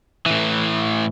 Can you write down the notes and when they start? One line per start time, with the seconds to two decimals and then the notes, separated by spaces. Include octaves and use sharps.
0.26 A2 E3